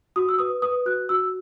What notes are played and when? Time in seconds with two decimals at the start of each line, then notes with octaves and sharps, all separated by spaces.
0.16 F#4 D#6
0.29 E6
0.39 B4 D#6
0.62 B4 D#6
0.86 F#4 F#6
1.09 F#4 E6